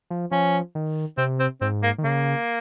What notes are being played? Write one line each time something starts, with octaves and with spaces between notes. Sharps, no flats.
F3
F3 C#4
D#3
C3 C4
C4
G#2 C4
A#3
D#3
C#3 A#3